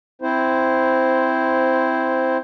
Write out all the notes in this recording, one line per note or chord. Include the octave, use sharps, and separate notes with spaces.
C4 E4 C5